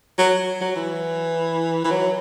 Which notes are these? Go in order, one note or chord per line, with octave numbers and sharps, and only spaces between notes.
F#3
F#3
E3
E3
F#3